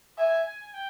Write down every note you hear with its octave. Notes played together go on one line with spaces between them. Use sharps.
E5 G#5
G#5
G5